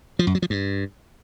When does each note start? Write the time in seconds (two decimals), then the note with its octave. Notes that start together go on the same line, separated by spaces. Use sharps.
0.19 F3
0.27 F#2
0.35 F#3
0.42 F3
0.50 G2